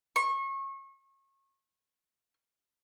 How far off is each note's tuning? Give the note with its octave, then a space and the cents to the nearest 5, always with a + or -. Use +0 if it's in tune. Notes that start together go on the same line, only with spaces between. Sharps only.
C#6 -30